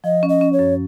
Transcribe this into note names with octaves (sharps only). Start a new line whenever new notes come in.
F3 D#5
C#4
D#5
C#4
C#5
F#2